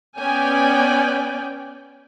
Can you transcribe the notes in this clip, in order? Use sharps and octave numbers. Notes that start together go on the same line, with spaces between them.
B3 C#4 D5 G5 G#5